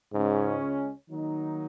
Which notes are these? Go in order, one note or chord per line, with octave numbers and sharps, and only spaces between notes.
C#2 G#2 C#3 G#3 C#4
D#3 F#3 A#3 D#4